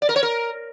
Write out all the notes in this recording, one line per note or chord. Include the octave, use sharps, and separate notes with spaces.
D5
A#4
C#5
A#4